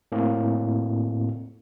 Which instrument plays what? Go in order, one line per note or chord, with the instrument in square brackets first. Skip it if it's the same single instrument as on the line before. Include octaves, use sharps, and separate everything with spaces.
[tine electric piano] A2 A#3 C4